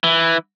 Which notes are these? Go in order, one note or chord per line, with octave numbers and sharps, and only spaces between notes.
E3